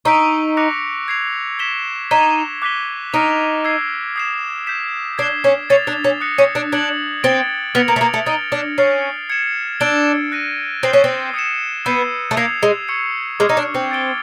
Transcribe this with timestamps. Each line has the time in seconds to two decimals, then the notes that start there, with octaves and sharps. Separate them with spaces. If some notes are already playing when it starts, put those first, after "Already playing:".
0.05 D#4 C#6 E6 G6 B6 D7
0.57 D6 F#6 A#6 C#7 F7
1.08 G#6 C7 F7
1.59 G#6 B6 E7 G7
2.11 D#4 G#6 B6 E7 G7
2.62 D6 F#6 B6 D#7 G7
3.13 D#4 F6 A#6 D7 F7
3.64 E6 G#6 C7
4.16 D#6 G#6 C7 E7
4.67 G6 B6 E7
5.18 D4 G#6 C7 E7 G7
5.44 C#4
5.70 C#4 A6 C7 F7
5.87 D4
6.04 C#4
6.21 D#6 F#6 A#6 C#7
6.38 C#4
6.55 D4
6.72 D4 G#6 C#7 F#7
7.23 C4 A6 D7 G7
7.74 B3 F6 A#6 C#7 F7
7.88 A#3
7.96 A3
8.01 A#3
8.14 A3
8.26 D#4 A6 D7 G7
8.52 D4
8.78 C#4 F6 A6 C7
9.30 G#6 C#7 E7
9.80 D4 E6 A6 D7 G7
10.32 F#6 A#6 D#7
10.83 C4 D#6 G6 C7 E7 G7
10.93 C#4
11.04 C4
11.34 D#6 G#6 C#7 E7
11.85 B3 E6 G6 C7 D#7
12.31 A3
12.36 A#3 D#6 G#6 C7 F7
12.63 G#3
12.88 C#6 E6 G#6 C#7 F7
13.39 G#3 D6 F6 G#6
13.49 D#4
13.57 D4
13.74 C4
13.91 A6 D7 G7